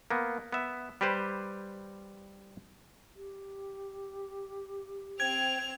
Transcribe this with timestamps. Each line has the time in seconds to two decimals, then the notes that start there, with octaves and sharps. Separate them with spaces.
0.11 A#3 B3
0.53 B3 E5
1.01 G3 G4 B4 C5
3.15 G4
5.20 C4 C5 G5 G#6 F7